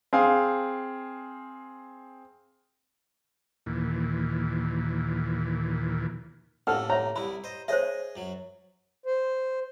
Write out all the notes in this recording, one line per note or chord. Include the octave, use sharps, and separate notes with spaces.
C4 G#4 F5
D#2 A#2 E3
A2 C3 A#3 A4 F#5 F6
C#5 E5 A#5
C2 C3 E4 B5
C5 D#5
G#4 C5 C#5 D#5 E5
F#2 F#3
C5